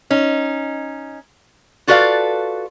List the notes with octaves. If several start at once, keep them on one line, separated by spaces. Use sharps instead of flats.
C#4 D#4
F4 F#4 A4 B4 D5 F5